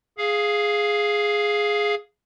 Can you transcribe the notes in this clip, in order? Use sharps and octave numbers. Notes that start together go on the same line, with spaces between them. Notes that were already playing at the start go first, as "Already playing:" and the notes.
G#4 F5